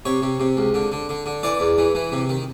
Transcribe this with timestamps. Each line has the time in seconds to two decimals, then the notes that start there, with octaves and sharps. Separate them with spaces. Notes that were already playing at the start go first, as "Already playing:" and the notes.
0.05 C3 C#5
0.22 C3
0.40 C3
0.57 C#2
0.74 D3
0.92 D3
1.09 D3
1.26 D3
1.43 E3 D5
1.60 E2
1.78 E3
1.95 E3
2.12 C3
2.29 D#3